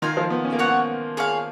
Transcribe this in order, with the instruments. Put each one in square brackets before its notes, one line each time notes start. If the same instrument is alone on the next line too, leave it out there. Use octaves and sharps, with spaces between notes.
[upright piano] D#3 [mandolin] F4 A#4 F5 G#5
[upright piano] F3
B3
C#4
A#3
[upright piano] B3 [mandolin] F#4 C#5 F#5
[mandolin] G#4 C#5 F5